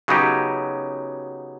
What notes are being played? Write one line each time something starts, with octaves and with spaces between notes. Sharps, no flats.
C#3 F#3 B3 D#4 G4